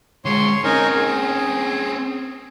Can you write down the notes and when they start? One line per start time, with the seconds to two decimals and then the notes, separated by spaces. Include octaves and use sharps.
0.25 D3 G#3 C#5 C6
0.64 C4 C#4 D#4 A#4 G#5
0.95 G#4